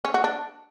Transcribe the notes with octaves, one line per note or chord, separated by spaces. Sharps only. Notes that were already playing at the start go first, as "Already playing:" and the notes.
C#4
F#4
D4